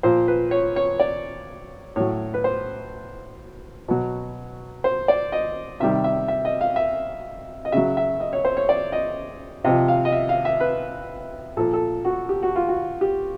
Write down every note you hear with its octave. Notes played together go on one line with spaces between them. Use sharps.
A#2 F3 C5
B4
C#5
C#5
D5
A2 F#3 C#5
B4
C5
B2 F#3
C5
D5
D#5
C3 D#3 G3 E5
E5
E5
D#5
F5
E5
D#5
C#3 F#3 E5
E5
D#5
C#5
C5
C#5
D5
D#5
C3 F3 D#5
F5
D#5
E5
F5
E5
B4
A#2 F3 A4
A4
F#4
G4
F#4
F4
F#4
G4